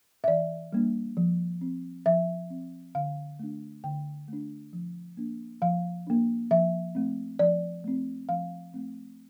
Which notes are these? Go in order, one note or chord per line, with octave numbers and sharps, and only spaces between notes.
E5
E3 D5
G3 A#3 D4
F3
C4
F3 E5
C4
D3 F5
A3 D4
D3 G5
A3 D4
F3
A#3 D4
F3 F5
A#3 D4
F3 E5
A3 C4
F3 D5
A3 C4
F3 F5
A3 C4